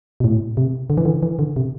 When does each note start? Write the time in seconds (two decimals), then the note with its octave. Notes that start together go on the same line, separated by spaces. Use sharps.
0.20 B2
0.24 A2
0.57 C3
0.90 D3
0.98 E3
1.05 D3
1.23 E3
1.39 D3
1.56 C3